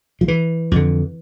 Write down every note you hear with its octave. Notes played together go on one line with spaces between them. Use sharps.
F3
E3
F2 D3